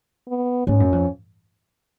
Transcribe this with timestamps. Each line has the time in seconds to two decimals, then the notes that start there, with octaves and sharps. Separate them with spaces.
0.29 B3
0.67 G#2 C#4
0.80 F#2
0.92 F2